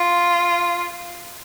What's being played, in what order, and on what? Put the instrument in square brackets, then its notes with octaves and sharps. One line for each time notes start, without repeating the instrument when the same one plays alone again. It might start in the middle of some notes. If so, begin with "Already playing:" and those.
Already playing: [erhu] F4